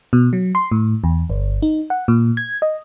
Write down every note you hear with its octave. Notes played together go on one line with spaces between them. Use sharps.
B2
F#3
C6
A2
E2
G1
D#4
F#5
A#2
G#6
D#5